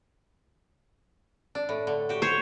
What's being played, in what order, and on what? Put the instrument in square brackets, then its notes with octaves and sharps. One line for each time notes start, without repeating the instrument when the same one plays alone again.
[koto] D4
A2
D3
F#4 G4
[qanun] C5 C#5